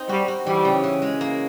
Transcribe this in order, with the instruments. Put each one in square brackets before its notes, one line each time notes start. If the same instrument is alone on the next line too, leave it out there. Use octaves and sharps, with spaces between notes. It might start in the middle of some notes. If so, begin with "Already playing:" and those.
Already playing: [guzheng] C4 D#4
[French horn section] G3 [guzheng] F#4
[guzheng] F#4
[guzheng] E3 [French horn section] G3
[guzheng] C#3
E3
G#3
A#3